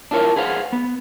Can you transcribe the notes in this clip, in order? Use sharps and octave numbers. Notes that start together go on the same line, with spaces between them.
D4 E4 F4 A#4 C#5
G#4 B4 C5 F5 F#5
B3